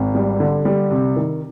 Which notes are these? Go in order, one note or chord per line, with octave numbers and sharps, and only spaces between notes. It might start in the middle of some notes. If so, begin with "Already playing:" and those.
Already playing: G#1
G3
D3
G3
C3
D#3